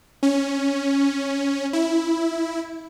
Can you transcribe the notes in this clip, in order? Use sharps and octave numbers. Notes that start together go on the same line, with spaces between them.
C#4
E4